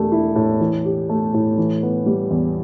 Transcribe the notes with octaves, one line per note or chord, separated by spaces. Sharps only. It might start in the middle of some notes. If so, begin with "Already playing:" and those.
Already playing: E1 A3 G4
E4
A2
E3
G4
A3
A2
E3
B3
G3
E2